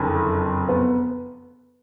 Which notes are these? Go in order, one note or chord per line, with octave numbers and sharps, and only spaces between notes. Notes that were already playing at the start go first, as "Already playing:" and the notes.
Already playing: F#1 F2 D3
B3